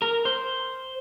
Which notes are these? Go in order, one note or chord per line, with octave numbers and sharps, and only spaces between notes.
A#4
C5